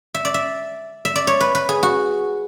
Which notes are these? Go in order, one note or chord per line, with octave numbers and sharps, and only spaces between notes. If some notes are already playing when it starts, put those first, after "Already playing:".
E5
D5
E5
E5
D5
C#5
B4
B4
G#4
F#4